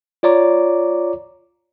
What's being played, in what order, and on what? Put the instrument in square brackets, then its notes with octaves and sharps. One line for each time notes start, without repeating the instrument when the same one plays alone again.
[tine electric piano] F4 C#5 D5 A#5 D6